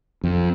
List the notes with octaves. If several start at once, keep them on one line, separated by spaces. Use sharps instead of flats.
F2